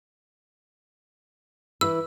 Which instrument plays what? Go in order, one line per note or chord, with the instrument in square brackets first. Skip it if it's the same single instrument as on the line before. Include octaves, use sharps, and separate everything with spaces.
[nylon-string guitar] E3 E4 B4 [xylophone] E6